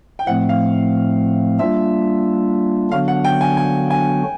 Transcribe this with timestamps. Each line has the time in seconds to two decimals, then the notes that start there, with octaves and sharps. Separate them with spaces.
0.19 G5
0.27 A2 F3 A3 C4 F#5
0.49 F5
1.59 G3 A#3 D4 F4 E5
2.91 D3 F#3 B3 D4 F#4 F5
3.08 F#5
3.24 G5
3.41 G#5
3.57 G#5
3.90 G#5